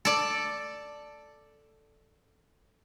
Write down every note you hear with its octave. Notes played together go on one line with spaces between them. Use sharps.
A4 D5